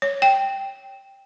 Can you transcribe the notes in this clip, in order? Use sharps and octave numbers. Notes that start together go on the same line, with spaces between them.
C#5
G5